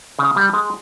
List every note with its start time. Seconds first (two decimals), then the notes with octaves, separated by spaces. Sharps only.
0.19 C#3
0.36 G3
0.53 G#3